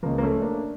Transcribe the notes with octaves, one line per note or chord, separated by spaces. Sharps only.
C#2 C#3 F3 A#3
A#3
A3 C#4
A#3 D4